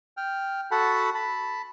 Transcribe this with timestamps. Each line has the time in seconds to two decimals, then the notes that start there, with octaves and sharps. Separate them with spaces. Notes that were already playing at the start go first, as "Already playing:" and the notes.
0.17 G5 F6
0.71 F#4 A4 F#5 A5 B5
1.15 A5 B5